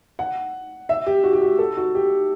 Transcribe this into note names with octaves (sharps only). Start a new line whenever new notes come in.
F#5
E5
G4
F#4
G4
F#4
A4
F#4
G4